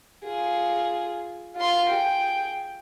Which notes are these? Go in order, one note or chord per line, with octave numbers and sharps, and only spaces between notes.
F4 G#4
F4 C6
G#4 G5